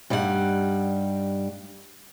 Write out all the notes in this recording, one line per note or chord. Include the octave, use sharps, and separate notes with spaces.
G2 G3 D#4 G4 F#5